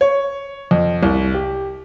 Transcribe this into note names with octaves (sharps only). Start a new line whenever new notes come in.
C#5
F2
C2
G4